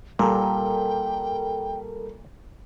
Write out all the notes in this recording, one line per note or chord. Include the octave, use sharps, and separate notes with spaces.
A#2 G3 A4 A#4 G5